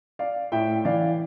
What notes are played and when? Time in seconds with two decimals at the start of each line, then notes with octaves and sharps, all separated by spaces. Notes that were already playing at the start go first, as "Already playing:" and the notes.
0.19 D5 F5
0.52 A2 E5 G5
0.85 E3 D5 F5